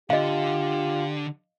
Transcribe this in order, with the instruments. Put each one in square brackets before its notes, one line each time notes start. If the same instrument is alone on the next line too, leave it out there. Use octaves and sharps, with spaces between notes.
[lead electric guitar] D3 [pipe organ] F4 [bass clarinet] G4 [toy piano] D#5 F5